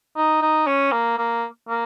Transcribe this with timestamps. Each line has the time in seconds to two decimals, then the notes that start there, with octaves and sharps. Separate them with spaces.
0.16 D#4
0.42 D#4
0.67 C#4
0.92 A#3
1.18 A#3
1.68 A#3